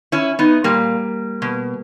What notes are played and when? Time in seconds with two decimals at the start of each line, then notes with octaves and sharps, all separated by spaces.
0.12 C#4 E4
0.39 B3 D#4
0.64 A#2 G3 A#3
1.42 B2